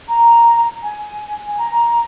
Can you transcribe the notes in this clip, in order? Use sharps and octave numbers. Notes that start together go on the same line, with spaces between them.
A#5
G#5
G#5
A#5